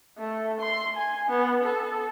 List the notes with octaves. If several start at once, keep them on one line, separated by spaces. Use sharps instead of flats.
A3
C6
G#5
B3
A4